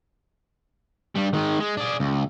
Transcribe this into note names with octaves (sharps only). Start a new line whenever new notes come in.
G2 G3
D#3 G#3
G#3
D4 G#4
C#2